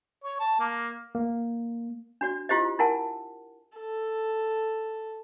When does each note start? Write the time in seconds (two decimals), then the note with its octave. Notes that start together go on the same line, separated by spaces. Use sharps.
0.24 C#5
0.40 A5
0.60 A#3
1.15 A#3
2.21 D4 F#4 D5
2.49 E4 F4 G4 C5 D#5
2.79 E4 A#4 F#5 G#5 A5
3.78 A4